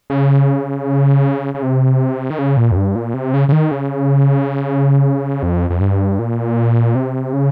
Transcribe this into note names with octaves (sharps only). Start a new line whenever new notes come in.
C#3
C#3
C3
D#3
C#3
A#2
F2
G2
A#2
C3
C#3
C#3
D#3
C#3
F2
F2
G2
A#2
C3
C#3